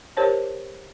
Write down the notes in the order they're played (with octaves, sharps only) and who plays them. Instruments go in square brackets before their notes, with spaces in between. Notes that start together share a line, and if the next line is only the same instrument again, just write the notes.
[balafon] G4 A#4 C5 C#5 A5